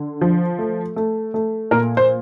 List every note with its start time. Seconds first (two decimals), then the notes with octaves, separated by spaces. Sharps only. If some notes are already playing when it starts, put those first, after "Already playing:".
Already playing: D3
0.21 F3
0.59 A3
0.96 A3
1.34 A3
1.71 A#2 A#4
1.97 C5